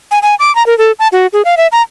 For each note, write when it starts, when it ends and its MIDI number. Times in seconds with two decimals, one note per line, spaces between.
0.11 0.19 80
0.22 0.35 80
0.40 0.54 86
0.55 0.65 82
0.66 0.77 70
0.78 0.92 69
0.99 1.08 81
1.12 1.27 66
1.33 1.42 68
1.45 1.55 77
1.57 1.67 76
1.72 1.82 82